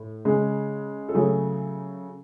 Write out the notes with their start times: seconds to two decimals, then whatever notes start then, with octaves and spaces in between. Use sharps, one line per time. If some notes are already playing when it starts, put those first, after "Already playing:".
Already playing: A2
0.25 C#3 G#3
1.09 A4
1.14 C#3 F#3 A3 G#4